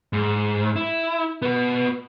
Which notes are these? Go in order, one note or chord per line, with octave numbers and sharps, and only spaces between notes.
G#2
E4
B3 F#4